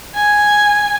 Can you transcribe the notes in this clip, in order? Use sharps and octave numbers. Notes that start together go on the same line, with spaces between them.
G#5